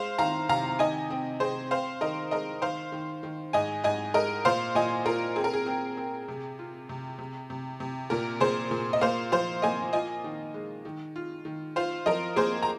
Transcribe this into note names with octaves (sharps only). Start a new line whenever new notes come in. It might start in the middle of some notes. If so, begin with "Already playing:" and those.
Already playing: G#3 C5 F5
D#3 F5 A#5
C3 F5 A#5
D#3 D#5 G#5
C4
C4 G#4 C5
C4 C5 F5
D#3 A#4 D#5
G#3 A#4 D#5
D#3 C5 F5
D#3
D#3
G#2 D#5 G#5
G#2 D#5 G#5
G#3 A#4 D#5
A#2 C5 F5
A#2 D#5 G#5
F4 A#4
C4 G#4
A#4
G#4
C4
C4
C3
F4
C3
C3
C3
C3
A#2 A#4
A#2 G#4 C5
A#2
D#5
A#3 C5 F5
F3 C5 F5
A#3 D#5 G#5
F4 D#5 G#5
D#3
G#3
D#3
F4
D#3
F4 C5 F5
F3 A#4 D#5
A#3 G#4 C5
A#5